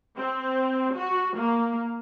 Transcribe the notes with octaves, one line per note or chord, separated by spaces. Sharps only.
C4
F#4
A#3